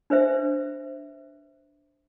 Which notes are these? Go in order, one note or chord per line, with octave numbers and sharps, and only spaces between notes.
D4 B4 C5 E5